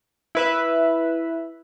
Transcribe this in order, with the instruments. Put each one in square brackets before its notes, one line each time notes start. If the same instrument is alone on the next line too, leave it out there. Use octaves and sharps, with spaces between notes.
[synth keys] E4 B4 E5